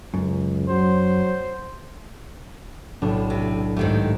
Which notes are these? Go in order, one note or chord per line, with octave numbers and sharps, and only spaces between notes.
C#2 F#2
F#3 C5
B1 A2 D4
C3
G#2 D#3 A3 G4 G5